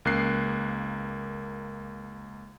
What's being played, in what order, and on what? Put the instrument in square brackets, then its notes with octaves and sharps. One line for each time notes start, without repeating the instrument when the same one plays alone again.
[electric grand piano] C#2 A#3 F#6 C7